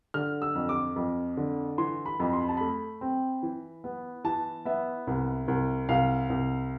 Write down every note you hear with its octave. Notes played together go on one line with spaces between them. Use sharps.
D3 F6
E6
F2
D6
F2
D3
E3 C6
B5
F2
C6
B5
A5
A3 B5
C4
E3
B3
E3 A5
B3 E5
C2
C2
C2 F5
C2